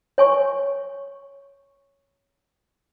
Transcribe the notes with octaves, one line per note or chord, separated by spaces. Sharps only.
C#5 G#5 C#6